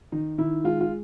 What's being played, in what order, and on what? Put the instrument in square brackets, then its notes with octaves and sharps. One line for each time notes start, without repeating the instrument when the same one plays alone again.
[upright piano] D#3 D#4
D#3 E4
G#3 F4
F4